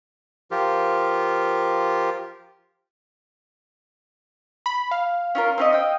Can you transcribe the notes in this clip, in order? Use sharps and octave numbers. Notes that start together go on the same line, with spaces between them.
F3 F4 G4 A#4
B5
F5
C#4 F4 A#4
C4 C#4 D#5
D#5 G5